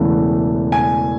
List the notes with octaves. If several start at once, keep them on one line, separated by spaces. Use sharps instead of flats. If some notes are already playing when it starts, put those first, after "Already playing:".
Already playing: E1 E2 C#3 E3 A3
G#5